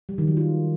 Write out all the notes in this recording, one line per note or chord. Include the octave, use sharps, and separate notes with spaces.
G3
D#3
F#3
F4